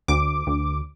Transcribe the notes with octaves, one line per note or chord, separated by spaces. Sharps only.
D2 D6
D2